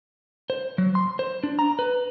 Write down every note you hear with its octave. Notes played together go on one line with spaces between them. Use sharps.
C5
F#3
C6
C5
D4
A#5
B4